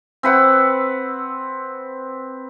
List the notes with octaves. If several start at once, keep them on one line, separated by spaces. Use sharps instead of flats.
C4 B4 F#5